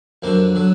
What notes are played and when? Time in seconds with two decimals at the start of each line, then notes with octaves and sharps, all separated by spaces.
0.22 F2 D3 F#3 A#3
0.55 D3 F#3